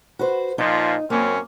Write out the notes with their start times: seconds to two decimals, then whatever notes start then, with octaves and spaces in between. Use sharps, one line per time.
0.19 F#4 B4 C5
0.58 A#2 F3 D#4
1.10 F#2 A#3 C4 C#4